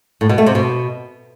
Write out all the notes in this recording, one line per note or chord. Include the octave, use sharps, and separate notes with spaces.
A2
B2
A3
C3
B2